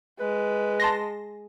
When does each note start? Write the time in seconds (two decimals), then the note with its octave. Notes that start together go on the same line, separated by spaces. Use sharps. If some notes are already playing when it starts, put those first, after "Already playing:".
0.20 G#3 B4
0.80 A5 C6 A#6